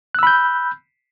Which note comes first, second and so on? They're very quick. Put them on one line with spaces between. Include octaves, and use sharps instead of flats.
F#6 E6 B5 G6